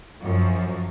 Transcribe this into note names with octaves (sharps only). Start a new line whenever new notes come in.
F#2 F3